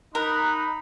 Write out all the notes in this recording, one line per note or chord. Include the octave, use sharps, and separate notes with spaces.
D#4 A#4 A#5 B5 F#6